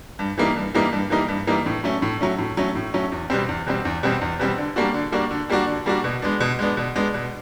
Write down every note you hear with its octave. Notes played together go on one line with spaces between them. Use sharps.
G2
E3 G3 A#3 D#4
G2
E3 G3 A#3 D#4
G2
E3 G3 A#3 D#4
G2
E3 G3 A#3 D#4
A2
F#3 A3 C#4
A2
F#3 A3 C#4
A2
F#3 A3 C#4
A2
F#3 A3 C#4
E2
B2 G3 C4
E2
B2 G3 C4
E2
B2 G3 C4
E2
B2 G3 C4
D3
G3 A#3 D4 F#4
D3
G3 A#3 D4 F#4
D3
G3 A#3 D4 F#4
D3
G3 A#3 D4 F#4
B2
G#3 B3 D4
B2
G#3 B3 D4
B2
G#3 B3 D4
B2